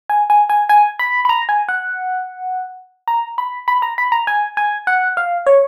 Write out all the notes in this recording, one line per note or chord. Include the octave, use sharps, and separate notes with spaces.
G#5
G#5
G#5
G#5
B5
B5
A#5
G#5
F#5
A#5
B5
B5
A#5
B5
A#5
G#5
G#5
F#5
F5
C#5